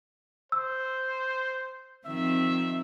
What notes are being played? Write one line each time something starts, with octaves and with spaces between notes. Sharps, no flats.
C5 E6
D#3 F3 C4 E5